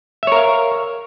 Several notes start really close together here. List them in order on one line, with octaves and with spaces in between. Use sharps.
E5 C#5 A#4 F5